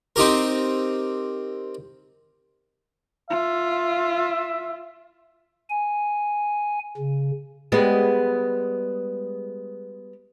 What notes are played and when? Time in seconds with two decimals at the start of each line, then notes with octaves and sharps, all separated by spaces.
0.16 C4 D#4 G4 A#4
3.31 F4 E5
5.70 G#5
6.97 C#3
7.72 G3 G#3 B3